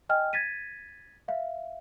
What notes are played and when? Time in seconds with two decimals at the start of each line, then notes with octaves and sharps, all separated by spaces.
0.09 D#5 G5 G#5 F6
0.33 G#6 A6 B6 D#7
1.28 E5 F5